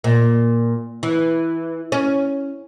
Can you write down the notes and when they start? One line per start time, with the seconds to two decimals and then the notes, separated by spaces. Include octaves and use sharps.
0.04 A#2
1.03 E3
1.92 C#4